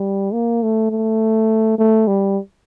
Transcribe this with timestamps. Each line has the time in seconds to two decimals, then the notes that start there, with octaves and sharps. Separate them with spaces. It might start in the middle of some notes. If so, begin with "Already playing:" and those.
Already playing: G3
0.33 A#3
0.63 A3
0.91 A3
1.78 A3
2.08 G3